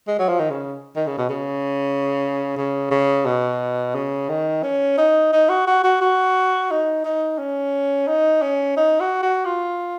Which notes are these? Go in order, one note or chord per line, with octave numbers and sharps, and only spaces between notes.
G#3
F#3
F3
D#3
C#3
D#3
C#3
B2
C#3
C#3
C#3
B2
C#3
D#3
C#4
D#4
D#4
F#4
F#4
F#4
F#4
D#4
D#4
C#4
D#4
C#4
D#4
F#4
F#4
F4